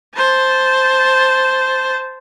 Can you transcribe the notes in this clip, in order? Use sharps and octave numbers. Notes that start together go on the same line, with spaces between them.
C5 A5